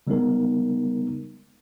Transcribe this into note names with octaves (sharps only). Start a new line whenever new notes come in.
C#3 G3 G#3 B3 D#4 A#4